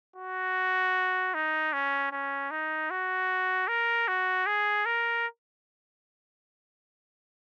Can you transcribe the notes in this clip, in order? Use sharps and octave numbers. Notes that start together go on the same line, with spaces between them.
F#4
D#4
C#4
C#4
D#4
F#4
A#4
F#4
G#4
A#4